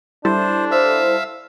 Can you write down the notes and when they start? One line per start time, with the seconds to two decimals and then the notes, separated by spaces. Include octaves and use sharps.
0.25 G3 D4 E4 A4 C5
0.71 C5 E5 F5